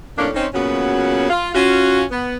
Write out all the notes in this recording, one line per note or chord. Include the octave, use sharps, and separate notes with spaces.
F2 A2 A#3 C#4 D4
C4 C#4 D#4
A#2 C#3 F#3 B3 C#4 F#4
F4
C#4 F4 F#4
B3